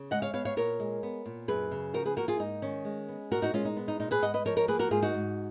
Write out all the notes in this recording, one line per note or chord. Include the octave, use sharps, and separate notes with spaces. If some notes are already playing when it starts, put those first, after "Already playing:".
Already playing: C#3
G#3 D#5 F#5
C#5 F5
B3 C#5 F5
C#5 F5
A#2 A#4 C#5
G#3
B3
A#2
F#2 G#4 B4
C#3
F3 F#4 A#4
G#4 B4
A#3 F#4 A#4
F4 G#4
G#2 D#4
D#3 C#4
G#3
B3
A#2 F#4 A#4
D#4 F#4
G#3 C#4 F4
D#4
B3
D#4
A#2 D#4
G#4 B4
G#2 D#5 F#5
B4 D#5
F3 A#4 C#5
A#4 C#5
A#3 G#4 B4
F#4 A#4
G#2 F4 G#4
D#4 F#4
G#2